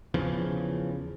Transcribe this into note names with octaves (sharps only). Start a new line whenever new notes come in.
E2 C#3 E3 F3